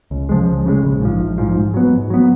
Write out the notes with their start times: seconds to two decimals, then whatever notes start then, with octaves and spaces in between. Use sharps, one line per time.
0.11 C#2
0.29 C#3 F3 G#3
0.48 C#2
0.66 C#3 F3 G#3
0.83 A#1
1.01 G#2 F3
1.19 A#1
1.38 G#2 F3
1.56 G#2
1.74 F#3 B3
1.92 G#2
2.10 F#3 B3